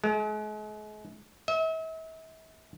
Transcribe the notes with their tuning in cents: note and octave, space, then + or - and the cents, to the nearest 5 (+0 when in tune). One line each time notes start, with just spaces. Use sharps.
G#3 +40
E5 -40